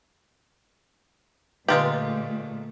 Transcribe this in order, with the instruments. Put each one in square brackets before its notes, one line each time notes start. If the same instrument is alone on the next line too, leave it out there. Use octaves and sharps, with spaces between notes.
[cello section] A#2 A3 [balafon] D3 B4 [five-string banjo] G#3 F4 G4